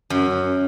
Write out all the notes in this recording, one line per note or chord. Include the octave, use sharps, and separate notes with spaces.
F#2